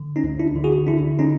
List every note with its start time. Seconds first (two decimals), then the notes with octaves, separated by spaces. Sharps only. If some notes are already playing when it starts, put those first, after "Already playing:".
Already playing: D3
0.16 C#4 D#4
0.24 D2
0.39 D4 E4
0.56 D3
0.64 F#4 G#4
0.87 D3 D4 E4
1.18 D3 C#4 D#4